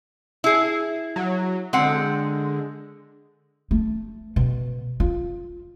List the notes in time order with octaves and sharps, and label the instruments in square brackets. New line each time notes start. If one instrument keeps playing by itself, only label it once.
[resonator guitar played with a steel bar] E4 G#4
[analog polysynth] F#3
[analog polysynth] D3 G#3 [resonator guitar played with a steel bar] C4 F#5
[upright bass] A3
B2
F4